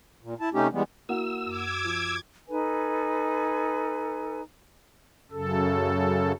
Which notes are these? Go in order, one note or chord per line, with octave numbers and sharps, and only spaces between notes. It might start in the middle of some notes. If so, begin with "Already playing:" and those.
A#2
E4 A5
C3 A3 C#4 D#4 G4
E3 G3 G#3 B3
A#3 E4 F#4 F#5 E6
F#2 D6 G#6
F3
D#4 A4 B4 G#5
F#2 C#3 A4